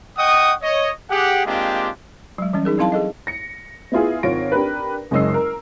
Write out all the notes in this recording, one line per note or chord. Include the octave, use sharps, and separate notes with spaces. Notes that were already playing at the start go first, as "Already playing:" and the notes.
D#5 F#5 G5 C#6 D#6
C#5 D#5
G4 G#4 F#5
G#3 A#3 C4 D4 F4 G4
F#3 G#3
E3 G3 C#4
D#4 G#4 A#4
F#3 C4 E4 F5 A5 C6
G#4 A4 D#5
A#6 C#7
B3 E4 F4 G#4
G#1 F4 C#5 A#6 D7
D4 G4 A#4 B4
F#1 G#3 C#4 D#5 E6 C7
A#4